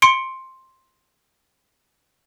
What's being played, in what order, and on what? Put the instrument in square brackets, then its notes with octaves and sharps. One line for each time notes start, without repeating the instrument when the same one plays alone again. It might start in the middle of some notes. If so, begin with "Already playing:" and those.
[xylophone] C6 C#7 D7